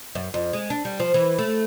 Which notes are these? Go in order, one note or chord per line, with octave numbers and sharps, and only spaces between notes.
F#2
F2
G#3
D4
G3
F3
E3
A3